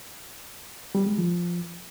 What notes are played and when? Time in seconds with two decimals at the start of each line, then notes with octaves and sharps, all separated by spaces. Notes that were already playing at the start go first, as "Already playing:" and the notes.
0.95 G3
1.06 G#3
1.18 F3